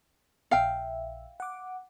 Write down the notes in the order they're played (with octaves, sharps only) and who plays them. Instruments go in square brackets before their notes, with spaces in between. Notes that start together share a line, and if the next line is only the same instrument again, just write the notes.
[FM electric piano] A#1 E5 [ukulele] F5 G5
[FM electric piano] F#5 D6